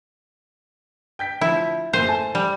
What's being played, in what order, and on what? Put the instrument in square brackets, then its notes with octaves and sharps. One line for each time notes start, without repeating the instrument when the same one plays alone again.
[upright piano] G5 G6 B6
[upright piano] D2 F3 [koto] E4
[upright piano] F#1 A#2 D#7 [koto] C5
[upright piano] A3 G#5 A5
[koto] G3